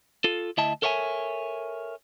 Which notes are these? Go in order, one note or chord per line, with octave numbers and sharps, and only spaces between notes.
F4 A4
D2 E4 D#5 E5 A5
A4 A#4 C#5 E5 F#5 G#5